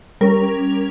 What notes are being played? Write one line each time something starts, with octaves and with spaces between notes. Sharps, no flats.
G3 C#4 A#4